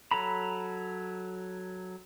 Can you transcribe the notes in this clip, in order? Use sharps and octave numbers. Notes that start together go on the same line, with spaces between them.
F#3 A4 A#5 B5